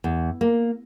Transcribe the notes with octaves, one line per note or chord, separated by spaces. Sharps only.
E2
A#3